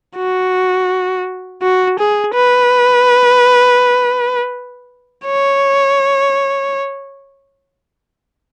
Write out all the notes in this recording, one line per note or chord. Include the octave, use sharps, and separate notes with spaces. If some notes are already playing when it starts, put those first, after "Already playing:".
F#4
F#4
G#4
B4
C#5